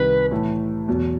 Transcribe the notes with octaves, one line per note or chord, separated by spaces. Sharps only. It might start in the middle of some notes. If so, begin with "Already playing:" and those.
Already playing: C2 C3 D#3 B4
A2 E3 A3
E2 B2 F#3